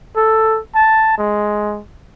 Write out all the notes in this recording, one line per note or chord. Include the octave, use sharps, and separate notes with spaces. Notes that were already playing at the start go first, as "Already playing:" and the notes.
A4
A5
G#3